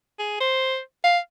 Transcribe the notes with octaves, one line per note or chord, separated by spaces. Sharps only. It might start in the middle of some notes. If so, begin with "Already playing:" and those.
G#4
C5
F5